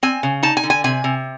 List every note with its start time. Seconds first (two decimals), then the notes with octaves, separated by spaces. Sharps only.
0.03 C4 G#5
0.23 C#3
0.43 D#4 A5
0.57 G#5
0.64 D3
0.70 G#5
0.84 C3 G#5
1.04 C3